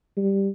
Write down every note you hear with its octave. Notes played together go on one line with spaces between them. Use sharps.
G3